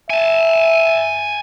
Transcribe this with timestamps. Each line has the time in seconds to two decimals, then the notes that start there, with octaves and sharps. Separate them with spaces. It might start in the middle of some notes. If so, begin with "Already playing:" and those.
0.10 E5 G#5 A5